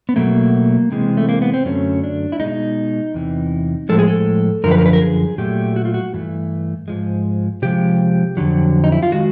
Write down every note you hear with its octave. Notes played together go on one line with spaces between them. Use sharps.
B3
B2 F#3 A3 A#3
C3 E3 G#3
A3
A#3
B3
C4
F#2 D3 F#3 A3 C#4
D4
E4
B2 G#3 D#4
E2 C3 E3
A2 F3 G#3 A4
G#4
A4
F#2 D3 F3 A#4
B4
A#4
B4
A#4
G#4
A#2 F#3 A3 G4
F#4
F4
F#4
G2 E3 A3
G#2 F3 G#3
C3 F3 G#3 G4
F2 D3 F#3
D#4
E4
F4
D#3 G#3 F#4